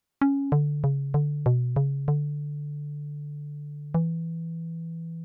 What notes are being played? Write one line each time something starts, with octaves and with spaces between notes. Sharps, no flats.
C#4
D3
C#3
D3
B2
C#3
D3
E3